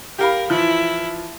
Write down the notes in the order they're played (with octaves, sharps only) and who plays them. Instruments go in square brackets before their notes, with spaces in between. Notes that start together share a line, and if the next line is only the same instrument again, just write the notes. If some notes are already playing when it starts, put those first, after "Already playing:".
[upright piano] G4 F5 B5 [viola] A#4
[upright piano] E3 F3 [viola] E4